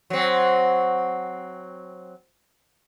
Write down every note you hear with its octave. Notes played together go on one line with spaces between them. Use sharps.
F#3 C4